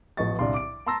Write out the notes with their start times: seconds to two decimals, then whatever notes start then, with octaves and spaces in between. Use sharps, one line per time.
0.17 A1 F3 B3 D#5 C#6 A6
0.39 C2 D3 D5 F5 C6
0.54 D6 D7
0.86 A5 A#5 C6 E6 A6 A#6